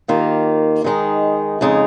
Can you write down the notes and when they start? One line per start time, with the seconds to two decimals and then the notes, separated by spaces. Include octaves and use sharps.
0.08 D#2 D#3 A#3 F4
0.84 D#3 G#3 D#4
1.61 F2 C#3 G#3 D#4